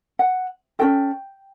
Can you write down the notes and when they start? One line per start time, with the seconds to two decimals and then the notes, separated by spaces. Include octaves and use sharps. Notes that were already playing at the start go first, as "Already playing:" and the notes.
0.19 F#5
0.79 C#4 F#4 A4 G5